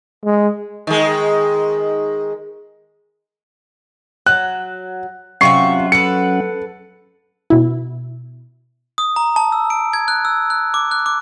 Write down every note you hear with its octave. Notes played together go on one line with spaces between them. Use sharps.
G#3
D#3 G#3
F#3 F#6
C3 F#3 C#4 F4 E5 F#5 C#6 C7
A4 B4 C#7
B2 E4
D#6
A#5
A5
E6
D7
G#6
F#6
E6
F#6
D6
F#6
D6